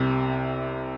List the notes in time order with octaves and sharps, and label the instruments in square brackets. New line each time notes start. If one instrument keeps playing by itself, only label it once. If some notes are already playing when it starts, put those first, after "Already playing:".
Already playing: [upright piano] C2 C3